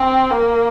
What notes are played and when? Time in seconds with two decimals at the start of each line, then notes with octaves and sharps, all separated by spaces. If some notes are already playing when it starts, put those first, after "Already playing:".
Already playing: C4
0.31 A#3